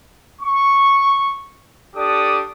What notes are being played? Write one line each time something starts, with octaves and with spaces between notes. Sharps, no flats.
C#6
D4 G4 A4 D5 D6 D#6